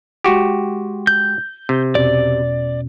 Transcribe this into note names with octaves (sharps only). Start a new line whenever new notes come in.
G#3 F#4 G4 G5 C6
G6
C3
E2 B2 C#4 D5